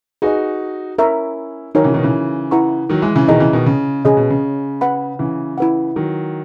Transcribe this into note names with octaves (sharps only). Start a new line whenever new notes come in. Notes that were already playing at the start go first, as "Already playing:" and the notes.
D#4 F#4 G#4 B4 D#5
C#4 E4 A#4 E5 A#5 C#6
D#3 F#3 D#4 F#4 A#4 C#5 G#5
C#3 E3
B2 D#3
C#3 E3
E4 B4 F#5 A#5 C#6
D#3 F#3
E3 G#3
C#3 E3
B2 D#3 E4 G#4 D#5 A#5
C#3 E3
B2 D#3
C#3
C#3 C#4 G#4 D#5
B2
C#3
B4 F#5 B5
C#3 E3
E4 B4 F#5
D#3 F#3